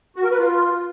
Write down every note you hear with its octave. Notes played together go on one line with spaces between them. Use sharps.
F#4
A#4
B4
F4